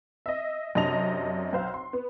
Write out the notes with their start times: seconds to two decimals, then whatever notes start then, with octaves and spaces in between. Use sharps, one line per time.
0.26 D#5 E5
0.75 F#2 C3 D4 D#5 A5 F7
1.53 B1 C5 F5
1.74 C6
1.93 B3